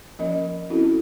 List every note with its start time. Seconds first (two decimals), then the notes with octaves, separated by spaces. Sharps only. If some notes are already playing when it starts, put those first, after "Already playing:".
0.19 F3 A#3 C#4 A#4 D#5
0.70 C4 C#4 E4 F#4 A4